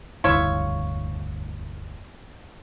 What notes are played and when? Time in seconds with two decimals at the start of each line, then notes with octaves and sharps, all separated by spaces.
0.24 E1 D2 G2 E4 F4 C#5